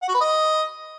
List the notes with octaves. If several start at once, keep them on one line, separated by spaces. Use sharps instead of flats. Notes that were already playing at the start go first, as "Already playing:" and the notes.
F#5
F#4
B4
D#5